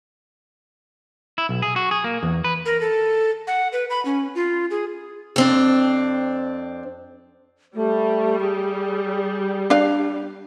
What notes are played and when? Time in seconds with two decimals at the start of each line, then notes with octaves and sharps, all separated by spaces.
1.38 E4
1.49 B1
1.62 G#4
1.76 F#4
1.91 G#4
2.04 A#3
2.23 E2
2.44 B4
2.66 A#4
2.81 A4
3.47 F#5
3.73 B4
3.90 B5
4.05 C#4
4.35 F4
4.71 G#4
5.36 F2 C4 D4
7.75 G3 A3
8.41 G#4
9.70 D4 F5